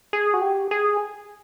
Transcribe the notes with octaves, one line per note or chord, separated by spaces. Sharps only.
G#4
F#4
G4
G#4